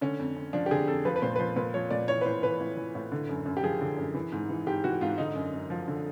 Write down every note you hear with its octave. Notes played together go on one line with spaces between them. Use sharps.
D3 C#4
F2
F2
F3 D4
G4
D3 G#4
F2 A4
F3 B4
B4
A#2 C5
B4
F3 C5
A#2 B4
F3 C#5
A#2 D5
E3 C#5
B4
A2 C5
E3 B4
A2
E3
A2
D3
F#2
F#2
G4
F3 G#4
D3
F#2
E3
G#2
E3
G#2 G4
E3 F#4
G#2 F4
D3 D#4
F#2
F#2
F3
D3